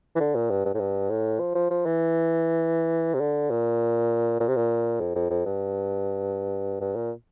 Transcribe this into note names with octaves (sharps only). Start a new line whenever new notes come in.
E3
D3
A#2
G2
G2
A2
G2
A2
F3
F3
F3
E3
C3
D3
A#2
A#2
C3
A#2
F2
F2
F2
G2
G2
A#2